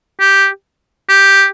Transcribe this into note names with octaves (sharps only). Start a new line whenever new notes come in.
G4
G4